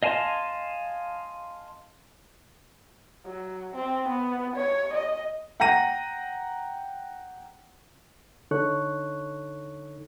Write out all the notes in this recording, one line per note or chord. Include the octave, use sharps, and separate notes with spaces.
D#5 F5 G#5 A5 C6
F#3
C4
B3
C#5
D#5
F#5 G5 A#5 A#6 D#7
D3 D#4 A4 C#5 C#6 F#6